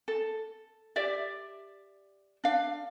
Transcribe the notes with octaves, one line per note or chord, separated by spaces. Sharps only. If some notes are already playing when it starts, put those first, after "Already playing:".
A4
G4 D5 E5
D4 F5